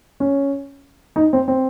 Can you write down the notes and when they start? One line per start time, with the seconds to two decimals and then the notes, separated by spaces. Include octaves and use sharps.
0.20 C#4
1.16 D#4
1.33 C4
1.48 C4